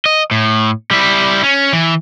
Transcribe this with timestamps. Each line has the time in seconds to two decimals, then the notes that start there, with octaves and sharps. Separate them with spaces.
0.06 D#5
0.31 A2
0.91 G3 E4
1.43 C#4
1.73 E3